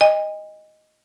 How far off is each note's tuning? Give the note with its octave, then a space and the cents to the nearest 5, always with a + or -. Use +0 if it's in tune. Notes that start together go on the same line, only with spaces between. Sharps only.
D#5 +0 G#5 -40